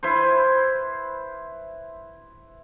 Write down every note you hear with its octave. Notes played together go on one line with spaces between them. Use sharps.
E4 B4 C5